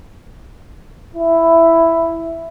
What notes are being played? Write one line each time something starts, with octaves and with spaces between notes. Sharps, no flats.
E4